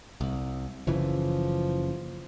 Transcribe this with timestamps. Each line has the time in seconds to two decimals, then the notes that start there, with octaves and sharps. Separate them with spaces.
0.21 C2
0.87 F#1 C#3 E3 F3